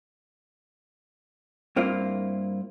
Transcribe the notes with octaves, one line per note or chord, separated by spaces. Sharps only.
G2 A#3 C4 E4 F4